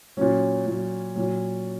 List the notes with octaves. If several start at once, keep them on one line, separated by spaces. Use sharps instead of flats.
A#2 F#3 C#4
A#2 F#3
A#2 F#3